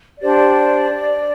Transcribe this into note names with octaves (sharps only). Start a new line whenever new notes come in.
D4 G4 C5 D5